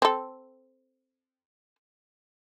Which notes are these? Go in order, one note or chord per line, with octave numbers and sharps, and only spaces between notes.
C4 A4